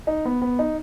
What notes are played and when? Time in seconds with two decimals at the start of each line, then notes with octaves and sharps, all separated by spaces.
0.07 D#4
0.25 B3
0.42 B3
0.59 D#4